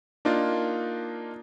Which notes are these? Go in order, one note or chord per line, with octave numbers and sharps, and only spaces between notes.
A#3 D4 D#4 F4